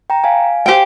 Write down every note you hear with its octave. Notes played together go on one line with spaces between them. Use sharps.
G5 A#5
F5 G#5
G4 C5 G5